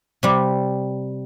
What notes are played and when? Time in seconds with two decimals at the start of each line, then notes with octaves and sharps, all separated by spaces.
0.23 C3 G3